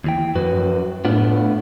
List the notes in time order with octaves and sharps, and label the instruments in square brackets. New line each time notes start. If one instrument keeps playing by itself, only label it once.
[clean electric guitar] D#2 E3 G5
[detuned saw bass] F#2 [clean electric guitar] F3 F#4 B4
[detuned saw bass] A2 [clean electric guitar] B3 D4 F4